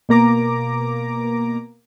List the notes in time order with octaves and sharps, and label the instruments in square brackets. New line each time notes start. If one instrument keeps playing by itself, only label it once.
[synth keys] B2 A#3 A#5 D6